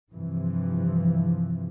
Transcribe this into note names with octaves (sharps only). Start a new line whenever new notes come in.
G2 C3 E3 F3